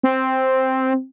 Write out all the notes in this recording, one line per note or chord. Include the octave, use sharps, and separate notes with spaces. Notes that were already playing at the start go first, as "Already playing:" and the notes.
C4